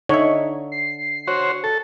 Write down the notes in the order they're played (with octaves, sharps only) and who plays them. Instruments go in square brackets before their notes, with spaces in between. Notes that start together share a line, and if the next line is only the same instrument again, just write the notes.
[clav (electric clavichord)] D3 E5 [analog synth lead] D#4 [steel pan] C#5
[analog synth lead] C7
[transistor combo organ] F#4 C5 C#5
A4